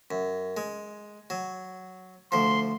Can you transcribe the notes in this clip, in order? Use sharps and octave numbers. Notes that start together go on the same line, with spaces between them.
F#2
G#3
F#3
D2 F3 C6